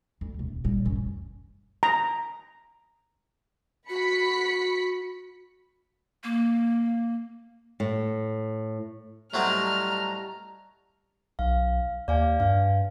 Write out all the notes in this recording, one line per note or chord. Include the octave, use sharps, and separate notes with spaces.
D2
E1
A#2 G3
F#2 C#4
A#5
F#4 B5 B6 C#7
A#3
A2
A2 F#3 G3 C4 D#5 A5 A#5 F6
B1 F5
D#2 D5 F5 G#5
G2 F5